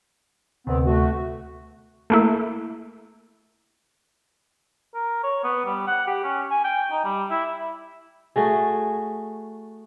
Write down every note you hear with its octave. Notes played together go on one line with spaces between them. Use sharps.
D2 C3 B3 C4
A3 F#4
A3 A#3 E4
A#4
C#5
B3
G3
F#5
G4
C#4
G#5
G5
D#4
G3
E4
A3 F#4 G#4